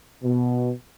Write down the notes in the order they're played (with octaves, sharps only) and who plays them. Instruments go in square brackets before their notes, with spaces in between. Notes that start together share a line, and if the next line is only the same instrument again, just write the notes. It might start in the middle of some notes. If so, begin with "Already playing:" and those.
[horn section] B2